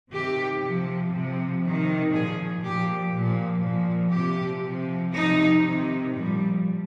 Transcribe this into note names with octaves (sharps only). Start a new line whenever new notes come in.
C3 D#3 G4
C3 F3
C3 F3
C3 D#3
A#2 F3 G#4
A#2 F3 G4
A#2 F3
A#2 F3
C3 F3 G4
C3 F3
C3 F3 D#4
C3 D#3
A#2 F3 G3